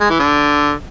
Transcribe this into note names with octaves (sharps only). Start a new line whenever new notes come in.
G#3
E3
D3